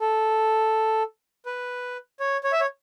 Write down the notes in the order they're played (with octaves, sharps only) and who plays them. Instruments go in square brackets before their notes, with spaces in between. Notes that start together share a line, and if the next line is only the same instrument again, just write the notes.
[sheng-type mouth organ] A4
B4
C#5
C#5
E5
C#5